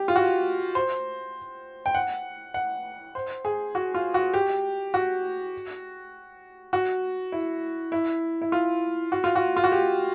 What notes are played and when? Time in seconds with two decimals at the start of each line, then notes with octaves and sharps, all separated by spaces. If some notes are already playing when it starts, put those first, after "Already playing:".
Already playing: G4
0.08 F4
0.16 F#4
0.75 C5
1.86 G5
1.95 F#5
2.54 F#5
3.15 C5
3.45 G#4
3.75 F#4
3.94 F4
4.14 F#4
4.34 G4
4.94 F#4
6.73 F#4
7.32 E4
7.92 E4
8.42 E4
8.52 F4
9.12 F#4
9.24 F4
9.36 F#4
9.57 F4
9.64 F#4
9.72 G4